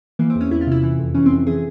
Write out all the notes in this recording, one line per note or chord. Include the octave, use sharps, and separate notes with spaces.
E3 A#3
C4
E2
C#4
E2 E4
F4
C3 E4
E3
F2
E3 C#4
C4
F2
E3 G#4